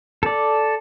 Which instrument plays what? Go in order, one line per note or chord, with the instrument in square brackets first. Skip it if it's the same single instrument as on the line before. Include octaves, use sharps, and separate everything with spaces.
[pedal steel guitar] A4 D5